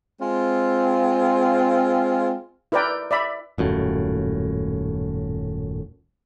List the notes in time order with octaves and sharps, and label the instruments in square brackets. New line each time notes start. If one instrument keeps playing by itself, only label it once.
[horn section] G#3 C4 F4
[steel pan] E4 A#4 B4 D5 G5
D5 E5 B5
[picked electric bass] D#1 F#2 A2